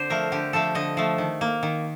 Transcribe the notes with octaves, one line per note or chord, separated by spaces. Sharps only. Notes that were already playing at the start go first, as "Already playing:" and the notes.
Already playing: D3 C4 C5 D5
F3 A3 A#4
D3 G4
F3 A3 A4
D3 D#5
F3 A3
D#3
A#3
D#3